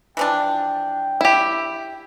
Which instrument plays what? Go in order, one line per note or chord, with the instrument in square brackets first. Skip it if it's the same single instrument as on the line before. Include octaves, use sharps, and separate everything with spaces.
[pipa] E3 F3 D4 [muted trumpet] G5
[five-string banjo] E4 G4